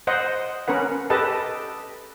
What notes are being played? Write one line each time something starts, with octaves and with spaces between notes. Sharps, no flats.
C5 D#5 F#5
C#4 A#4 B4 F#5
G4 A4 B4 D#5 A5